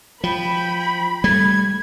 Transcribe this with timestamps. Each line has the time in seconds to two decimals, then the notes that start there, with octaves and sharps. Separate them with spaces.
0.24 F3 G5 B5
1.24 G3 A3 G#6